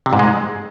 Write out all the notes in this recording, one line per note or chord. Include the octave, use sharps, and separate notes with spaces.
C3
G#2
G#3